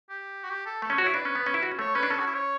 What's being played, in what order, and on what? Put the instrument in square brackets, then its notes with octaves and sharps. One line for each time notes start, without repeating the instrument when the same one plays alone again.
[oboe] G4
F#4
G4
A4
[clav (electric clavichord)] A3 [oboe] A4
[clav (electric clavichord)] C#4
[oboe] C#5
[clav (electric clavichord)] F#4
[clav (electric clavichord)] E4 [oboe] C#5
[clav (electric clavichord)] D4 [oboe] B4
[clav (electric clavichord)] C#4
B3
C#4
E4
F#4
C#4
[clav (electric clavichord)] A3 [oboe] C#5
[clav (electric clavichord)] C#4 [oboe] B4
[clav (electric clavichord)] D4
[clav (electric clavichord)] C#4 [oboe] A4
[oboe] F#4
E4
C#5